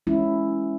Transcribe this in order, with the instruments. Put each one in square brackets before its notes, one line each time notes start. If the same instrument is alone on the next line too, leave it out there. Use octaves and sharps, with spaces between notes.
[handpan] E3 G#3 C#4 E4